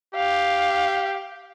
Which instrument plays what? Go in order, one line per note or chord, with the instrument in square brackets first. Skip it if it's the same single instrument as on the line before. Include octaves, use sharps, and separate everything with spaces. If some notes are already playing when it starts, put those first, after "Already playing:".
[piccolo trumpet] G4 [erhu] F5